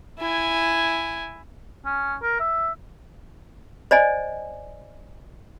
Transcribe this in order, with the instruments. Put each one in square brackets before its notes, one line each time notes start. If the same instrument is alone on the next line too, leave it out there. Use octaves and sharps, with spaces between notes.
[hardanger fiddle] E4 G#5
[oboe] C#4
A#4
E5
[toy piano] C5 D5 D#5 G#5